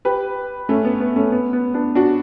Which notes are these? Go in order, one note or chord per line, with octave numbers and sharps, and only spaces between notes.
G4 B4
A3 C#4
B3
B3
A3 C#4
B3
B3
B3 D4
D4 F#4